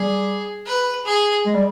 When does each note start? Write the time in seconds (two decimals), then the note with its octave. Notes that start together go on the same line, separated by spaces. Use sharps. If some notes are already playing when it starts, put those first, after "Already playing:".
Already playing: G3 G#4
0.66 B4
1.06 G#4
1.46 G#3
1.55 G3